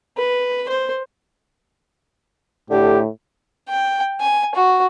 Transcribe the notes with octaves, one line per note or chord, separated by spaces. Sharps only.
B4
C5
A2 D3 G4
G5
G#5
F#4